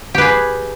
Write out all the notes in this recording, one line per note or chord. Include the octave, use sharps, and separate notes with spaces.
G4 G#4 B4